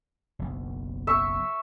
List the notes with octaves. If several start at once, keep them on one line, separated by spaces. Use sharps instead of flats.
F#1 B1
E5 C#6